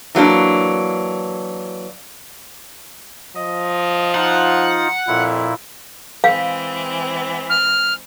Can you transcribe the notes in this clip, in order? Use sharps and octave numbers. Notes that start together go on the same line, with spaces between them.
E3 F#3 A#3 D4
F3 D#5
D#4 F4 F#5
F2 A#2 E4
E3 G#3 C4 F5
F6